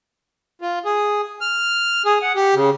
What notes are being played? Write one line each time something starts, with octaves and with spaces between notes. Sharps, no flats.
F4
G#4
F6
G#4
F#5
G4
C#3